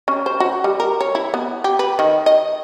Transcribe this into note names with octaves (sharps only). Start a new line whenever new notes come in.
C#4
C5
F#4
G3
A#4
C#5
E4
B3
G4
B4
D#3
D#5